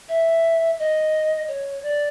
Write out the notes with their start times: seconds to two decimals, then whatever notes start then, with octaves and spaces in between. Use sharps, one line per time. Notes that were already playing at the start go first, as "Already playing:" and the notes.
0.09 E5
0.79 D#5
1.48 C#5
1.83 D5